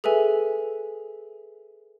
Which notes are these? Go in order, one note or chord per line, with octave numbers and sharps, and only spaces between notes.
G#4 A4 B4 E5 G#5